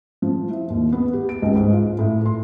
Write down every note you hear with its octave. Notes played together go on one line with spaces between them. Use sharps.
F3
E4
D#2
B3
G4
D7
C#2
G#2
F4
A2
C6